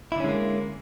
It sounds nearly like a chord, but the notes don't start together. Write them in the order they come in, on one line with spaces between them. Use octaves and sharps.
E4 D3 C#4 G#3 A#3